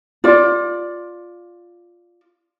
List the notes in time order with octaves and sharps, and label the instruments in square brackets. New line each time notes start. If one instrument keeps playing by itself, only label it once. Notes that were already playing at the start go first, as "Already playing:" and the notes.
[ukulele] F4 D5